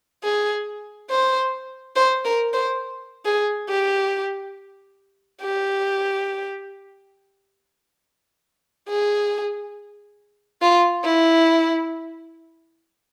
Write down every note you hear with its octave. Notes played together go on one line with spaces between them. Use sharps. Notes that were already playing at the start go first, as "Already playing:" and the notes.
G#4
C5
C5
A#4
C5
G#4
G4
G4
G#4
F4
E4